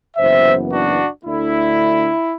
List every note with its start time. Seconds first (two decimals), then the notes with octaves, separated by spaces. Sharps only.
0.17 F#1 F#2 E3 B3 C5 E5
0.71 D4 F#4
1.24 D2 D3 A3 D4 E4